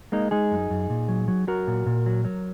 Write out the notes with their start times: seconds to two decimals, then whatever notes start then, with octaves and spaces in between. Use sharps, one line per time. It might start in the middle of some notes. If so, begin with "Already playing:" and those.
0.12 G#3 A#3 D#4
0.31 G#3 D#4 G#4
0.52 F#2
0.70 F#2
0.90 A#2
1.08 F#3
1.28 F#3
1.47 F#3 F#4 A#4
1.68 A#2
1.86 A#2
2.06 F#3
2.25 F#3